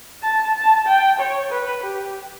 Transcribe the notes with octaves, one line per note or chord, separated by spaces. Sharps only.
A5
A5
G5
C#5
B4
G4